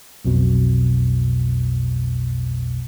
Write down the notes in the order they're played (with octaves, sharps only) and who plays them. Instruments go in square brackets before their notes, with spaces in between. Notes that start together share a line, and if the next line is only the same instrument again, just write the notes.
[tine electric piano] B1 F2 B2